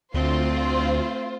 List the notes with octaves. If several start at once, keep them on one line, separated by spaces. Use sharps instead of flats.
D2 A3 C4 F4 C5